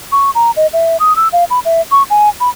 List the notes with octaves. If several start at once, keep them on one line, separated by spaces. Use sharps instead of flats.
C#6
A#5
D#5
E5
D#6
E6
F5
B5
E5
C#6
G#5
B5